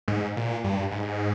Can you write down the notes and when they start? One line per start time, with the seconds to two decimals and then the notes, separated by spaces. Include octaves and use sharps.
0.08 G#2
0.37 A#2
0.64 G2
0.91 G#2